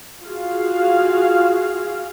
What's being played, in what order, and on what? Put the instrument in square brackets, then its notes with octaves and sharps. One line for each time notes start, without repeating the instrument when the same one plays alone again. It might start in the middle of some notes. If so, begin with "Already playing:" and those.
[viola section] F4 F#4 G#4 F5